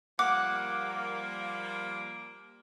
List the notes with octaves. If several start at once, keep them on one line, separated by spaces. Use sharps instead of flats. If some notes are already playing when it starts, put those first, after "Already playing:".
F3 G3 A#3 F#5 D6